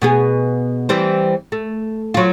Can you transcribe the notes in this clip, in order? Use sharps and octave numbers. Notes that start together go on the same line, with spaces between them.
B2 B3 G#4
E3 G3 C4
A3
F#3 F4